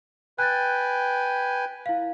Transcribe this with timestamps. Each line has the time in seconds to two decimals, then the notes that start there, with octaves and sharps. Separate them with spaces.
0.39 B4 G5 G#5 F#6 A6
1.86 E4 F5